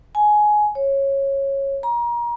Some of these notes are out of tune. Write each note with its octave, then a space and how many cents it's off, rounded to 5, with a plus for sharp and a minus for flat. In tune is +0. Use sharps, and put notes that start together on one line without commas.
G#5 +15
C#5 -15
A#5 +30